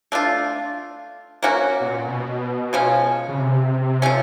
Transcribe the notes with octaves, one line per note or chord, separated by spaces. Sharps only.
A3 D4 F4
A#3 C#4 F#4
B2
A#2
B2
C#3 F3 G#3 C#4
C#3
C3
F3 A3 C#4